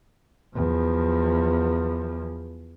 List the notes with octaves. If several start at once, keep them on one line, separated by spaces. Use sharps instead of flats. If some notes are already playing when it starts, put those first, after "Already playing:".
E2 F3